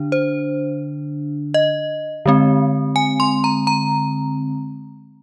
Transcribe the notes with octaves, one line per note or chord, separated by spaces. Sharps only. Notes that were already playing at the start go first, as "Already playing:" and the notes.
Already playing: D3 D4
C5
D#5
D3 G#3 C4
G#5
C6
A#5
A#5